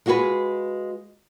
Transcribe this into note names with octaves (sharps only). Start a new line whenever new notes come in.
G#3 F4 F#4 G#4 B4